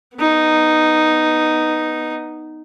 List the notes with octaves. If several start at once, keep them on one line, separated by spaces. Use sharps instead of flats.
B3 D#4